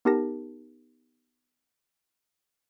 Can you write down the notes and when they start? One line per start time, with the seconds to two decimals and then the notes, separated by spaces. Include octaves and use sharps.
0.05 B3 D#4 G4 A#4 A5 A#6